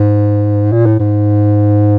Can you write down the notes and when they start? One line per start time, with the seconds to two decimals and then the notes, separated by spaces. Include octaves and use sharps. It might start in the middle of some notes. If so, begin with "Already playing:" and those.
Already playing: G#2
0.73 A#2
0.86 A2
0.99 G#2